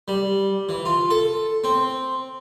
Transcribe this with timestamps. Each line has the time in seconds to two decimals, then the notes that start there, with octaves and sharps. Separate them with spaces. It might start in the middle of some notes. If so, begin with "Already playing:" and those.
0.08 G3
0.69 E3
0.85 F4
1.11 A4
1.64 C4